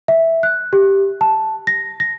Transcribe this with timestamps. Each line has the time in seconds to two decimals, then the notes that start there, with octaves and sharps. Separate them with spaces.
0.08 E5
0.43 F#6
0.73 G4
1.21 A5
1.67 A#6
2.00 A#6